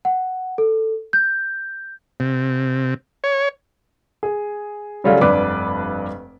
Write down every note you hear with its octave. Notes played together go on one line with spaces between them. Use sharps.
F#5
A4
G6
C3
C#5
G#4
C#3 F#3 G3 A3 F4 G#4
F1 G2 D4 B4 D5 D6